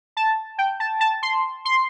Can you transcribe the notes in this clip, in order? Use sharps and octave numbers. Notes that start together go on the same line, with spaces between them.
A5
G5
A5
A5
C6
C6